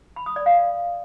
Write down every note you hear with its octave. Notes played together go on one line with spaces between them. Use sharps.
B5
D#6
D5
F5